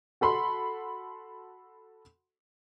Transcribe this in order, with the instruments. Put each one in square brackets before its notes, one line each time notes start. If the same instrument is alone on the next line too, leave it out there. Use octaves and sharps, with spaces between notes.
[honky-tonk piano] F#4 A4 B5 C6